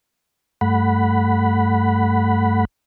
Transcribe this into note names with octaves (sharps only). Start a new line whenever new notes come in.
G2 A3 F#5 B5